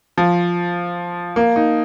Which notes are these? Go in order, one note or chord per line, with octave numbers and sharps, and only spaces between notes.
F3
A#3
D#4